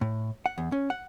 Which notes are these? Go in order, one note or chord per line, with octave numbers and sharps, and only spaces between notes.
A2
F#5
E2
C#4
F#5